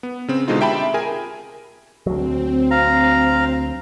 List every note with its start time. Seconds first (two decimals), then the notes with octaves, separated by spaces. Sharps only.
0.03 B3
0.28 C#3 C4
0.48 B2 D3 G#3 C4 D#4 F4
0.59 F4 G4 E5 G5 A5 B5
0.94 G#4 A#4 G#5
2.06 D2 F#3 C4
2.71 F5 A#5